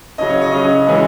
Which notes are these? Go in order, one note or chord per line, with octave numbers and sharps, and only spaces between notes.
C#3 F#3 C#4 D#5
C#5
D#5
C#3 F#3 C#4 D#5
C#3 E3 G#3 C#4